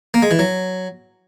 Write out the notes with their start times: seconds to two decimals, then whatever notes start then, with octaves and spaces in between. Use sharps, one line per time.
0.14 A#3
0.22 G#3
0.31 E3
0.39 F#3